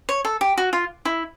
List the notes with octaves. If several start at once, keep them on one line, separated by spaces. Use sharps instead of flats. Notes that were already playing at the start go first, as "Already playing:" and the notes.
C#5
A4
G4
F#4
F4
E4